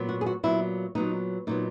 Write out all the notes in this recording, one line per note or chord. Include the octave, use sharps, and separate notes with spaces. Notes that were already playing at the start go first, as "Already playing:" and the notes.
Already playing: A#2 F#3 B3
F#4
G#4
F#4
A#2 F#3 B3 E4
A#2 F#3 B3 D#4
A#2 F#3 B3 D#4